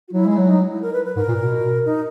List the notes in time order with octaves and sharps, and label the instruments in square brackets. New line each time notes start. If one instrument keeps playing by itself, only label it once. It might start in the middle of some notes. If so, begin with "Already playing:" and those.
[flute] F#4
[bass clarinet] F#3 [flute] E4
[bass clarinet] G#3 [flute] E4
[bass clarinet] F#3
[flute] E4
D#4
E4
A#4
B4
B4
[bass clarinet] G#2 [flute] A#4
[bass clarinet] A#2
B2
[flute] D#4